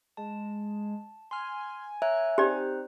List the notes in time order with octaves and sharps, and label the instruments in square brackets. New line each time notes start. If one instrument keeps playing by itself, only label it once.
[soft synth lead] G#3 [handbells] A5
[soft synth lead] G#5 [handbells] C6 F6
[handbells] C#5 A#5 F#6 [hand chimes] E5
[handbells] C4 D#4 C5 [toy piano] G4 D5 [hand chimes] F#6